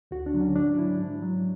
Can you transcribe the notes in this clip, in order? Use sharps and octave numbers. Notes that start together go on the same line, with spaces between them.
D2 F#4
D4
D3 F#3
C#4
G#2 D4
F#3 E4
G#2
F#3